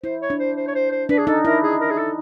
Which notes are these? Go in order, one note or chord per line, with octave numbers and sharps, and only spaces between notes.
E4 C5
C#5
D4
C5
C5
C#5
C5
C5
D4 B4
G#4
D#4 A4
E4 A#4
G#4
A#4
G#4
A4